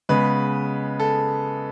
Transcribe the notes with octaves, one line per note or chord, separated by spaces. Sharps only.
C#3 G#3 B3 B4
A4